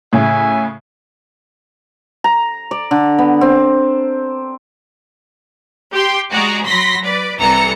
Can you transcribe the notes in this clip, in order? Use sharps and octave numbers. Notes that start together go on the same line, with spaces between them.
A2 C#3 E5 G#5
A#5
D5
D3
B3
C4
G4 G5 C6
G#3 F#4 G#4 D5 A#5
F#3 B5 C6 A#6 B6
B4 D5
C2 E3 A4 A#5 C#7